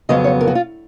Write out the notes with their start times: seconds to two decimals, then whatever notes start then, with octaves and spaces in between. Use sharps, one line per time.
0.09 F2 C#3 F#3 B3 D#5
0.24 C#5
0.41 A#4
0.47 F#4
0.55 F4